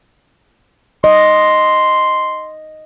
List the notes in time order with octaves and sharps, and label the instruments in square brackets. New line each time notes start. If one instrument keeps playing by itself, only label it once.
[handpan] D#5 [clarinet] C6